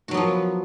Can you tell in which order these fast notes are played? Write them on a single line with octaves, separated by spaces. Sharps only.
F#4 F#3 B3 F3